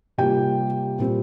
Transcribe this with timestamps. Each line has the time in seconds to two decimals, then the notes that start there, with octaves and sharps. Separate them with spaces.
0.18 C3 G3 A#3 F4 G4 G5
0.99 A#2 G3 C4 F4